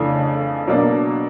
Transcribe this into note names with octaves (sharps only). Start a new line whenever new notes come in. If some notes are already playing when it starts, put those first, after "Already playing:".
Already playing: F2 C#3 E3 A3 D4
B2 F#3 A#3 D4